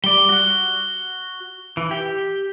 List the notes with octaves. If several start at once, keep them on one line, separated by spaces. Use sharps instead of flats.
G3 D5 G7
F#4 F#5
E3
G4 G5